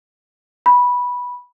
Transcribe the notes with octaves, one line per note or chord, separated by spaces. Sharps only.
B5